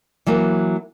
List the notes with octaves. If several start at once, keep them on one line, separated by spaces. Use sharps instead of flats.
E3 F#3 A#3